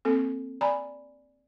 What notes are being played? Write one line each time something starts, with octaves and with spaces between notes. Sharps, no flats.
A#3 C4 A4
D5 G#5 A#5 B5